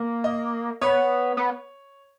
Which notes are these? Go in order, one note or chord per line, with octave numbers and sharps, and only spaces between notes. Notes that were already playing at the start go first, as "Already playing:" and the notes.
Already playing: A#3
D#5
B3 C#5
B3